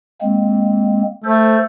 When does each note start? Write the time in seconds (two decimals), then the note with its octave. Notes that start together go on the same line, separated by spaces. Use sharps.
0.21 G#3 A#3 C4
1.24 A3 A4 C5